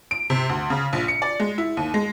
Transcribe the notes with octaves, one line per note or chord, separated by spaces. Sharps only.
D7
C3
D2
C#3
A#1
C#7
D5
G#3
E4
D#2
G#3